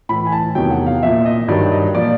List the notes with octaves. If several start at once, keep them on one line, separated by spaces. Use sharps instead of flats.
A2 E3 B5
G#5
A5
E2 C3 D#3 F#3 G5
F#5
F5
A#2 F3 E5
D#5
G2 D#3 F#3 D5
D#5
A#2 F3 D5